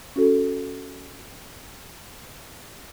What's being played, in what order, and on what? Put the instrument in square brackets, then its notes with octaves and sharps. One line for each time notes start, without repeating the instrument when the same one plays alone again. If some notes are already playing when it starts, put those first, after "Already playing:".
[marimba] C#4 F#4 A4